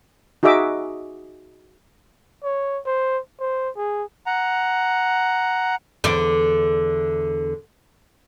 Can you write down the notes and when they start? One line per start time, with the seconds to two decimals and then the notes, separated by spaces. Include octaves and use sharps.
0.43 D#4 F#4 G#4 D#5 E5 D6
2.44 C#5
2.86 C5
3.40 C5
3.76 G#4
4.26 F#5 A#5
6.04 E2 D3 D5